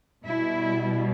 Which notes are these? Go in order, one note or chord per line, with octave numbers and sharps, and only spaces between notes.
B2 G3 E4